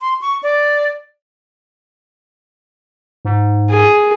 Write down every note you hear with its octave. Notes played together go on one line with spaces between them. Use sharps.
C6
C#6
D5
G#2
G#4